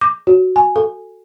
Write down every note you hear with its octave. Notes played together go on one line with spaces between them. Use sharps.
D6
F#4
G#5
A4